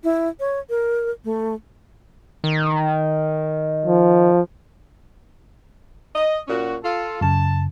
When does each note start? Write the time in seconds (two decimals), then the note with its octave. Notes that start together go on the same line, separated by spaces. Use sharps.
0.04 E4
0.40 C#5
0.70 A#4
1.24 A3
2.44 D#3
3.86 F3
6.15 D#5
6.48 A#2 C#4 F#4
6.83 F4 A4
7.21 F#2 C#3 A5